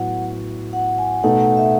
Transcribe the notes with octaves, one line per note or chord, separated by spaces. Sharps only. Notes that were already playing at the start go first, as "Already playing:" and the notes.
Already playing: A2 F#3 B3 F#4 F#5
F#5
G#5
B2 A3 D#4 A4 F#5
F#5
E5